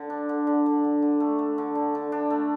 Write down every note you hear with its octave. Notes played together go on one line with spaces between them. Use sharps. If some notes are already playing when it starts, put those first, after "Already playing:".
Already playing: D3
D4
D3
D3
D3
D3
D3
A3
A3
D3
D3
D3
D4
A3